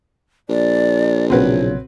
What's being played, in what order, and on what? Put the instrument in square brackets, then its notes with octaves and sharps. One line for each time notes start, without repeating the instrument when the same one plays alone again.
[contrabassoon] A#1 [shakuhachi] D5
[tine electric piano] B1 A#2 C#3 [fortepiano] C4 F#4 B4 [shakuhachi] C#5